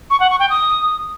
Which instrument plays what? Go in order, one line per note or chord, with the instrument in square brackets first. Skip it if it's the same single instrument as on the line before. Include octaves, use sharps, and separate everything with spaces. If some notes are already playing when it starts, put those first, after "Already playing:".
[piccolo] C#6
F#5
C#6
G5
D#6